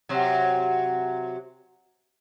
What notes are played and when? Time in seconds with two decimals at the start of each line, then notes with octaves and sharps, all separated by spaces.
0.09 C3 F#3